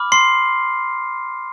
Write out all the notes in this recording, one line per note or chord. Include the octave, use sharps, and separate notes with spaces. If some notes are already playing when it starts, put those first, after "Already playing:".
Already playing: B5 D6 F6
C6 C7